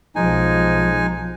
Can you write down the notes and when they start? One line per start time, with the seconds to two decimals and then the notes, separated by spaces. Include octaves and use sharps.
0.16 B1 F3 G#3 D#4 G#5